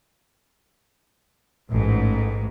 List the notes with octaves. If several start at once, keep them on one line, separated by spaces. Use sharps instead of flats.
A1 G#2